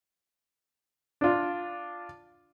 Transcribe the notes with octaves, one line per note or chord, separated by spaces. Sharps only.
D4 F4